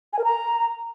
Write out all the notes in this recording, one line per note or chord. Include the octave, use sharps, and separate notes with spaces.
G#5
A#4
A#5